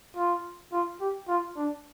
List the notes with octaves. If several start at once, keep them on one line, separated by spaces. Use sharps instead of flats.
F4
F4
G4
F4
D4